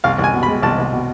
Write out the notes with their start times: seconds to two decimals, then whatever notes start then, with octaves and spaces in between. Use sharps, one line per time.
0.04 C2 F5
0.18 C2
0.24 G#5
0.34 B2
0.43 B5
0.48 G#3
0.62 C2 A5
0.78 C2
0.93 B2